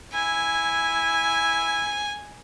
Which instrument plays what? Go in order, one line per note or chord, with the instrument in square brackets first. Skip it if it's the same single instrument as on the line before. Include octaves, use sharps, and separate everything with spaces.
[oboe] E4 [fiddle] G#5